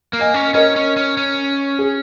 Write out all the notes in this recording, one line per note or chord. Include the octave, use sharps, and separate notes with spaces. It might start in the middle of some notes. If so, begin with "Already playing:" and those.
A#3
D#5 G#5
C#4
C#4 A#4 D#5
C#4
C#4
C#4
G#4